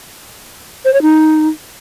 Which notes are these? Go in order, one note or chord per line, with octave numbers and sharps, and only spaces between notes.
C5
C#5
D#4